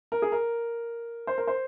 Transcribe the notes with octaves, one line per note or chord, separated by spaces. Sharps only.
A#4
G#4
A#4
C5
A#4
C5